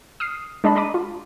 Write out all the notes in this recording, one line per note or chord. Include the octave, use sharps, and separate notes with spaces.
D#6 F6 C7
G#3 D4 D5 D#5 A5 B5
D4 A#5 B5 D6 D#7
F4